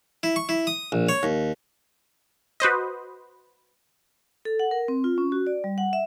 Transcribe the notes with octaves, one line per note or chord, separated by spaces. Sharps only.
E4
C#6
E4
D#6
A#1
C#5
D#2
F#4 B4 C5 D#5
A4
F#5
A#4
C4
F4
C#4
F#4
D5
G3
F#5
E5